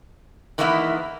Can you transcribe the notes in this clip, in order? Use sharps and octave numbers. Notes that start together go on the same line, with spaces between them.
D#3 E3 G#3 A#3 B3 E4